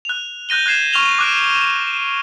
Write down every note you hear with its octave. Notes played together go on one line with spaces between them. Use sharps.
F#6 F7
F#6 G6 A#6 D#7 G7
F#6 G#6 C7 E7
C#6 F6 F7 G7
D6 F#6 D7
D#7